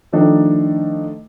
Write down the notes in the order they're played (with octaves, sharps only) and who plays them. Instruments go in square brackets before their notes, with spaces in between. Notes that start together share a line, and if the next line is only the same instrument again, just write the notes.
[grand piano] D#3 F3 A3 D4 D#4 A4